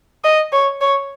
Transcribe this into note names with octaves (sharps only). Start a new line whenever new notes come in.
D#5
C#5
C#5